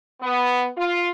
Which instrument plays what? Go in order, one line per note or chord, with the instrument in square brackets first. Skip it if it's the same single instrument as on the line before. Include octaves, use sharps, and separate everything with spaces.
[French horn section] B3
F4